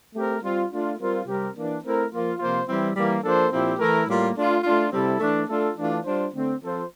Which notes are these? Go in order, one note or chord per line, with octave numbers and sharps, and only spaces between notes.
A3 C4 G4 A#4
G3 C4 F4
A3 D4 F4
G3 C4 F4 A#4
C3 G3 C4 G4 A#4
E3 A#3 D4
A3 C4 E4 A#4
F3 A#3 F4
C3 F3 A#3 F4 C5
E3 G3 C4 E4
E3 G3 A#3
F3 A#3 D4 A4 C5
A#2 F3 C4 E4 G4
E3 A3 E4 A#4
A2 G3 A#3 F4
A3 D4 F4
A3 D4 F4
C3 G3 C4 E4 A4
E3 A3 D4
A3 D4 F4 A4
E3 A3 D4 F4
G3 D4 F4 C5
D3 A3 C4
F3 C4 F4 A4 C5